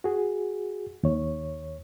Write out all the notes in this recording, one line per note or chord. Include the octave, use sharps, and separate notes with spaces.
F#4 G#4
D#2 C#5